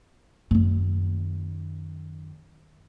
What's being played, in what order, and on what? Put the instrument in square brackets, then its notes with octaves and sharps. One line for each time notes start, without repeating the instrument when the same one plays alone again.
[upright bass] F#2 D#3